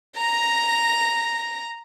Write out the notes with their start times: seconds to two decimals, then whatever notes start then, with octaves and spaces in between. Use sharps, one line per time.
0.17 A#5 A#6